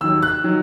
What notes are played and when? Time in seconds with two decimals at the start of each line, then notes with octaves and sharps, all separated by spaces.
0.01 D#2 D#3 F#3 E6
0.23 F#6
0.44 D#3 F#3